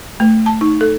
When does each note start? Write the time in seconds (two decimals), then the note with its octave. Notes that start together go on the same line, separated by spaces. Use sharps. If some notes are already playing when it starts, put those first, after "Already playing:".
0.20 A3
0.46 A5
0.61 D#4
0.81 A4